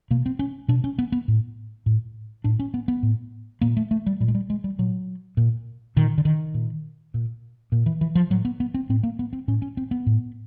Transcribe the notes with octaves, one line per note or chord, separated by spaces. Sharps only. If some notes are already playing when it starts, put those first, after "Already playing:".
B2 A#3
C4
C#4
B2 D4
C#4
B3
B3
A2
A2
A2 D4
C#4
B3
B3
A2
A#2 A#3
A3
A3
G3
A#2 G3
G#3
G3
G#3
G3
A#2 F#3
A#2
A#2 D#3
D3
D#3
A#2
A#2
A#2
E3
E3
F3
A2 F#3
B3
B3
C4
A2 C4
A#3
B3
C4
A2 C#4
C#4
C4
B3
A2